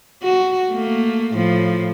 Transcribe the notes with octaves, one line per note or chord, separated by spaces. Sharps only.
F#4
A3 A#3
A2 F3